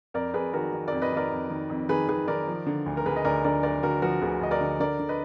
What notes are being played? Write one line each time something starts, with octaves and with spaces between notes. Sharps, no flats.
F2 A#4 D5
F2 G#4 B4
D#3 F#4 A#4
D#3
F2 A#4 D5
B4 D#5
D#3 A#4 D5
F2
D#3
F2
D#3 G#4 B4
D#3 G#4 B4
D#3 A#4 D5
F3
D3
D2
A#4
D2 G#4 B4
D#5
D2 A#4 D5
D3 A#4 D5
D2 A#4 D5
D2 F#4 A#4
F3 F#4 A#4
D2 G#4 B4
D2 D#5
A#4 D5
D3
D3 A#4 D5
D3
B4 D#5